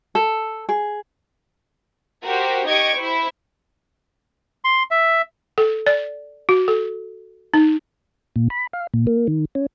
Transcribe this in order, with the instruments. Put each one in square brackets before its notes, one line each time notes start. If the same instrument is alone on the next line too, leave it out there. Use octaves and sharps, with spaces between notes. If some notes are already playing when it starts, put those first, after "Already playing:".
[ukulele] A4
G#4
[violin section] F#4 G4 A#4 C5
D#4 G4 D#5 C#6 G#6 D7
E4 C5
[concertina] C6
E5
[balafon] A4
D5
F#4
A4
D#4
[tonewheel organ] A#2
B5
F5
A#2
A#3
D#3
C#4